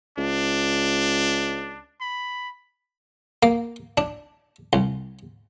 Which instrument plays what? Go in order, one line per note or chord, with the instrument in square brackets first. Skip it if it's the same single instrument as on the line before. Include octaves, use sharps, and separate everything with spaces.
[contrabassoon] C#2 [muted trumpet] D4
[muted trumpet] B5
[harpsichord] A#3
D4
C2